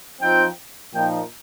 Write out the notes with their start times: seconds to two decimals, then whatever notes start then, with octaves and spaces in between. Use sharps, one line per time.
0.21 F3 C4 D#4 G5
0.94 A#2 F3 D#4 G5